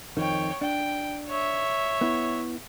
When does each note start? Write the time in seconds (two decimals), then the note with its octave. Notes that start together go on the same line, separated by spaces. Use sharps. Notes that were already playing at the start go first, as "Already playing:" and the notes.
0.17 F2 D#3 C#5 G5
0.61 D4 G5
1.28 C#5 E5
2.01 B3 E4